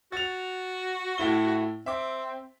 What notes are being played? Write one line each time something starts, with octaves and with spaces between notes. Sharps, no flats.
F#4 A6 F7
A2 E4 G7
C4 E5 D6